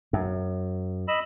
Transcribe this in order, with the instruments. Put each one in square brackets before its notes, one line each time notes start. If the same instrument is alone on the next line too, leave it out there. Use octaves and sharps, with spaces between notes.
[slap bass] F#2
[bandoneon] D#5 B5 E6